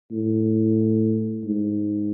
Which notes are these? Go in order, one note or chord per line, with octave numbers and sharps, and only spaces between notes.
A2
G#2